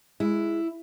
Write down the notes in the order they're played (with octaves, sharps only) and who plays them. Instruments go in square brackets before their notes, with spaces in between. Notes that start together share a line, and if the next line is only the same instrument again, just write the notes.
[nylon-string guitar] G#3 [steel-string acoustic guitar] E4